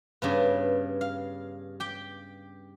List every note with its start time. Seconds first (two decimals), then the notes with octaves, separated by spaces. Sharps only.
0.22 G2 C#3 B3
1.01 F5
1.80 G4 G5